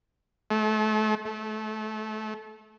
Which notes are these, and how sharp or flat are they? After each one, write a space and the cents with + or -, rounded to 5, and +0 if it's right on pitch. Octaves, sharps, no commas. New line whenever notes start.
A3 -35
A3 -25